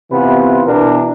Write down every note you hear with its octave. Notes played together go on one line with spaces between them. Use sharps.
C3 E3 B3 F4 B4
B2 E3 D4 A#4